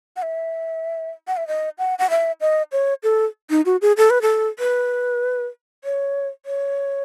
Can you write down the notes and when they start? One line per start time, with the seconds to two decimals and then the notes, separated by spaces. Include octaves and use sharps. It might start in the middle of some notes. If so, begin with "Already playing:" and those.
0.16 F#5
0.22 E5
1.28 F#5
1.37 E5
1.48 D#5
1.78 F#5
1.99 F#5
2.10 E5
2.41 D#5
2.72 C#5
3.03 A4
3.50 D#4
3.66 F#4
3.82 G#4
3.97 A4
4.10 B4
4.22 A4
4.59 B4
5.84 C#5
6.46 C#5